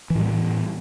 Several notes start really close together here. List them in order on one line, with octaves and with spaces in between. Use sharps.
E3 A2 G3 B3